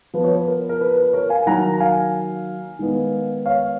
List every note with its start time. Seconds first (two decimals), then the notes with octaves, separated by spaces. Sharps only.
0.14 F3 B3 F4 B4
0.24 C#5
0.35 B4
0.47 A#4
0.69 A#4
0.81 B4
0.97 B4
1.13 A#4 C#5
1.29 F5 G#5
1.46 D#3 F#3 A#3 D#4 F#5 A#5
1.73 A#5
1.80 F5 G#5
2.79 D#3 G#3 B3 D#4
3.46 C#5 F5